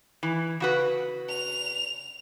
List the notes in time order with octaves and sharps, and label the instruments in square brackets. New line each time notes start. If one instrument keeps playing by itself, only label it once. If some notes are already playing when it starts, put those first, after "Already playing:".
[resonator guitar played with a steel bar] E3
C#3 F#4 B4
[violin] F7